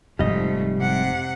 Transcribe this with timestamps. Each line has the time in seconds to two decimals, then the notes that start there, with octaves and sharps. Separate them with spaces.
0.19 F1 G#2 F3 G3 A3 D#5
0.78 C3 F#5